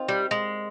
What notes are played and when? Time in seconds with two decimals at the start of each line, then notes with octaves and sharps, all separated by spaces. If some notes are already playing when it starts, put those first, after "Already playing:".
Already playing: D#3 C4 F4
0.08 G3
0.31 G#3